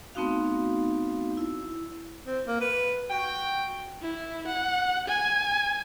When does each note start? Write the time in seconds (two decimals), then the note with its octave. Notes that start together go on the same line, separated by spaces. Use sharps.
0.15 A3 B3 C4 D#4 F#4 F5
1.37 E4
2.26 C4
2.47 A#3
2.61 B4
3.10 F#4 G5
4.02 E4
4.47 F#5
5.08 G#5